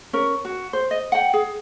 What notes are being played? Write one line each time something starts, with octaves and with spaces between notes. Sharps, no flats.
C#4 A#4
F#4
C5
D#5
F#5 G5
G#4